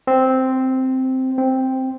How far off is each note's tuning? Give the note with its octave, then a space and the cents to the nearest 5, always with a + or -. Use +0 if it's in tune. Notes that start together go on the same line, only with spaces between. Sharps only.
C4 -5
C4 +0